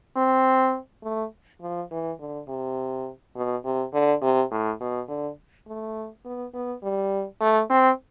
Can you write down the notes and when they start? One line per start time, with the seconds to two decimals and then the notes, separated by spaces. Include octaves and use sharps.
0.17 C4
1.04 A3
1.61 F3
1.91 E3
2.20 D3
2.48 C3
3.36 B2
3.64 C3
3.93 D3
4.22 C3
4.51 A2
4.81 B2
5.08 D3
5.67 A3
6.25 B3
6.53 B3
6.83 G3
7.41 A3
7.70 C4